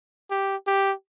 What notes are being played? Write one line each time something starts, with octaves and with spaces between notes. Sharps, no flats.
G4
G4